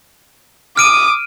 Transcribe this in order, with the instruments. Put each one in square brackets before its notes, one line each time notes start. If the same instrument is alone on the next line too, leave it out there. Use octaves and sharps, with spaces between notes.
[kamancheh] D6 D#6 [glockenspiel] F6 D7 D#7